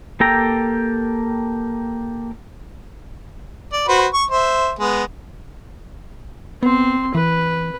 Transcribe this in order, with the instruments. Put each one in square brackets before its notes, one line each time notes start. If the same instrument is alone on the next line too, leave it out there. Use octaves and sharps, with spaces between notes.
[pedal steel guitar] A#3 G4 A4 G5 A#5
[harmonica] D5
F#4 B4 C5
C#6
C5 E5
G#3 B3
[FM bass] B3 [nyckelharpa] C4 C6
[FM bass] E3 [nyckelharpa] B4